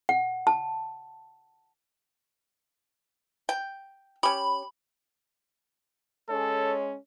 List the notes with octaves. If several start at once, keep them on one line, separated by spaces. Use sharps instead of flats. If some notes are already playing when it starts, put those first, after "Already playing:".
F#5
A5
G5
C#4 G4 B5
G#3 C#4 A4 C#5